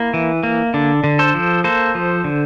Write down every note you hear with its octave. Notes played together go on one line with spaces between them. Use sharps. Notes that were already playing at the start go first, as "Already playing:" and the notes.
Already playing: A#3 E4
E3
A#3
D3 D4
D3
A4 C5
F3
A#3 A4 C5
F3
D3